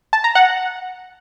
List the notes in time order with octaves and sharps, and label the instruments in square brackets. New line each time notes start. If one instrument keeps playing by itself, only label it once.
[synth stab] A5
A#5
F#5